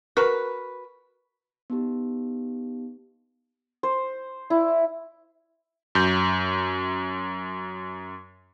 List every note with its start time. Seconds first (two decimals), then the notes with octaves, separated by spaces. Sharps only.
0.17 F#4 A#4 B4
1.70 B3 D#4 G4
3.83 C5
4.50 E4
5.95 F#2 G6